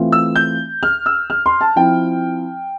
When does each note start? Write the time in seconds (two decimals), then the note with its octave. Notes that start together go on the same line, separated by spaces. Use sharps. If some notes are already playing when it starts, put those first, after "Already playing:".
Already playing: E3 A3 C4 F4
0.12 E6
0.36 G6
0.83 F6
1.06 E6
1.30 F6
1.46 C6
1.61 A5
1.76 F3 C4 E4 G5